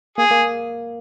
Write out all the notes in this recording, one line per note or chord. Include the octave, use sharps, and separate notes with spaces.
A#3 G#4
A#3